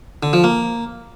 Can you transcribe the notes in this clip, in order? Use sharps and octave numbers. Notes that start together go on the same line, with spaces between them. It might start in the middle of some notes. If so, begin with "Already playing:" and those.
D3
F3
A#3